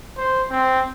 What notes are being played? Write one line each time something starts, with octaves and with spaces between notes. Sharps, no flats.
C5
C4